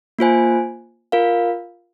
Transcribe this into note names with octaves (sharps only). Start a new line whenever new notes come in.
A#3 F4 C5 G#5
F4 A#4 F5